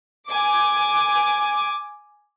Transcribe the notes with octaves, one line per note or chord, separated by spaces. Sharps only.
G#5 D6